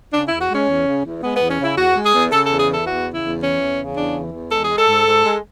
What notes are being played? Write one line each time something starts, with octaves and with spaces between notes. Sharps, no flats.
C#3 D4
E2 E4
F#4
G#3 C#4
E2
C#3
E2
G#3 B3
B3
E2
C#4
C#3 E4
E2 F#4
G#3
G#4
E2
C#3 A4
E2 A4
G#4
E3 A4
E2 F#4
C#3
E4
E2
E3 C#4
E2
C#3
E2 D4
E3
E2
G#3 A4
G#4
G#3
A4
G#2
G#2
G#3